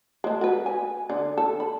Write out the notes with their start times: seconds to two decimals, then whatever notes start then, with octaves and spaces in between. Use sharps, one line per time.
0.24 G#3 A3
0.41 F#4 B4
0.66 G#5
1.10 D3
1.37 A4
1.60 B5